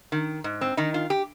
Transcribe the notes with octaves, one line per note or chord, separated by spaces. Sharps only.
D#3
G#2
C4
D#3 D#4
F4
G4